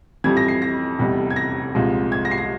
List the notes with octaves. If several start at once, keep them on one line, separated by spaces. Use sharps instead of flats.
F2 E3 G3 G#6
A#6
C7
A#6
F1 E2 E3 G3
G#6
A#6
C2 A#2 F3 G#3
G#6
A#6
C7
A#6